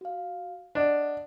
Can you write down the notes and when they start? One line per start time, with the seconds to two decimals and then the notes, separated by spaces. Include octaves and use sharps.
0.01 F#4 F5
0.75 D4 D#5 F#5